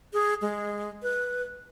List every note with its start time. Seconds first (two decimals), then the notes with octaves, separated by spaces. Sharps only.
0.13 G#4
0.41 G#3
1.02 B4